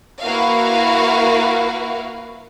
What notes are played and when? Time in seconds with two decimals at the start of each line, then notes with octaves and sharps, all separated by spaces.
0.21 A#3 E4 F#4 B4 F5